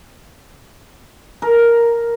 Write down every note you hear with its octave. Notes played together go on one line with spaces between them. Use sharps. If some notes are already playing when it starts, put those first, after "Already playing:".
A#4